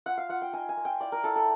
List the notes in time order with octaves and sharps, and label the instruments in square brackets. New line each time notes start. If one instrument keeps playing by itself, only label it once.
[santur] F4 F#5
F5
F4 F#5
G5
D#4 G#5
G#5
A#3
G5
E4 D5
A#4
E4 A4
A4